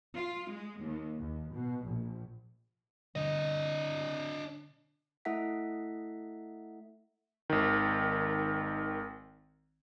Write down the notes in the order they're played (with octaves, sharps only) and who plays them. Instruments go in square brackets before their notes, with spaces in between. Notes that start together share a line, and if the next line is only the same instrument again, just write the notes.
[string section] F4
G#3
D#2
D#2
B2
A#1
[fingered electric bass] B2 D3 G3 [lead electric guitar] D4 D#5
[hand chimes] A3 E4 A4 E5 F#5 B6
[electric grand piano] G#1 D#3